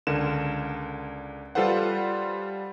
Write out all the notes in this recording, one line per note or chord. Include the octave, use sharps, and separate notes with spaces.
C#2 D3 A#4 E7
G3 F4 A4 B4 C5 F#5